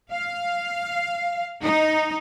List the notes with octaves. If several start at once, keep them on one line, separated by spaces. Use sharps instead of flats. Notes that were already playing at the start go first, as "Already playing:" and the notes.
F5
D#4